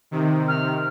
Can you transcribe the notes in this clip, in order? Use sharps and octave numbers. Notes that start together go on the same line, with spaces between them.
C3 D#3
F6